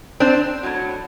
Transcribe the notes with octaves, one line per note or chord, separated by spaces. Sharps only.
C4 D4
A2 F#3